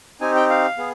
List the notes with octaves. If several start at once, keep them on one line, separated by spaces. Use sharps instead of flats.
C4 D#4 G4 G#5
G5
F5
B3 G#4